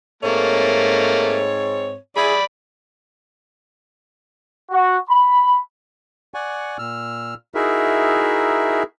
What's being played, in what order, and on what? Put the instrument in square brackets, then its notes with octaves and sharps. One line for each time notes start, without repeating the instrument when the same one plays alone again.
[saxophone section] G#2 C4 C#5 [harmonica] A3 A#3
[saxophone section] E4 G#4 [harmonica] D5 B5
[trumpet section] F#4
B5
[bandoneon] D5 F#5 G#5 C#6
A#2 E6 F6
D#4 E4 F#4 G#4 A#4 E5